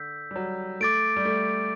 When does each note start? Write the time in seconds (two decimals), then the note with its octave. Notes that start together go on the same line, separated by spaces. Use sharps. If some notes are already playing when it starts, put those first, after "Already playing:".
Already playing: D3 E6 G6 B6
0.31 G3
0.36 F#3
0.80 A3 D6 A6 D7
1.16 G3
1.25 A3